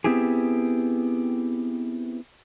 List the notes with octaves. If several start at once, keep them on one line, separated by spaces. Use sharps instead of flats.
B3 C4 E4 G4 G#4